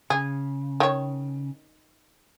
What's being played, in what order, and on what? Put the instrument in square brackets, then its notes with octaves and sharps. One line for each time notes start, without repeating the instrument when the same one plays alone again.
[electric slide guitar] C#3 [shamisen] G#4
[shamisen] D#3 C#5